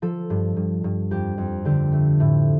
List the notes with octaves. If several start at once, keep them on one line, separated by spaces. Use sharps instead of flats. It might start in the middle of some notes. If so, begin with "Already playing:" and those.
F3 A4
G2
G2
G2
F2 G4
F2
D3 G4
A3
A2